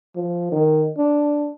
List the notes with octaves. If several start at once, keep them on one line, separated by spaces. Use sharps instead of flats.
F3
D#3
D4